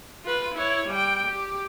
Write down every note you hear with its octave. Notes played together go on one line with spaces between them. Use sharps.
F4 B4
E4 C#5
G3 G5
G4